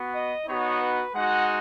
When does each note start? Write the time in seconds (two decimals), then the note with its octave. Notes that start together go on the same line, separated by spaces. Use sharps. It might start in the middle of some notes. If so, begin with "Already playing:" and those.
Already playing: B3 F#4
0.13 D#5
0.47 B3 D#4 F#4 C#5
0.81 B4
1.15 G#3 D#4 F#4 F#5